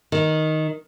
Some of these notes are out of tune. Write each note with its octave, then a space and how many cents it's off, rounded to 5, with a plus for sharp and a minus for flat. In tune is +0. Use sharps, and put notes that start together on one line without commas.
D#3 +5